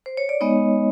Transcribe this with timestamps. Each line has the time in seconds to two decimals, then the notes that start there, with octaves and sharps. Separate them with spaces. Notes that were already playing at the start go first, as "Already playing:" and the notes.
0.06 C5
0.17 C#5
0.29 D5
0.41 G#3 B3 D#4 C#5 D#5